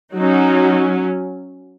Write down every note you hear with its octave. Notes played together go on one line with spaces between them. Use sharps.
F#3 C#4 D#4 F#4